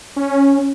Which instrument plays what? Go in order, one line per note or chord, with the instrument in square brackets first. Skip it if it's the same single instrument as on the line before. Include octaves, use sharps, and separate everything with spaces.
[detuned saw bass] C#4